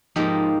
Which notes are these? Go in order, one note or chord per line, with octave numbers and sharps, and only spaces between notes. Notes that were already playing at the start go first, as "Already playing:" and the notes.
G#2 F3 A#3 D#4 G4